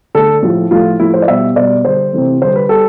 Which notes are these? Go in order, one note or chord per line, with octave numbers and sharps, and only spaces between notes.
D3 A3 A4
A2 F3 A3
A2 F3 A3 F4
A2 F3 A3 E4
C5
D5
B2 G3 E5
B2 G3 D5
D3 G3 C5
C3 E3 A3
D3 G3 C5
B4
G3 A4